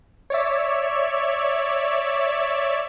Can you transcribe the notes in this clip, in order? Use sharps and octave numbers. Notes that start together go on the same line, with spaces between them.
C#5 D5 E5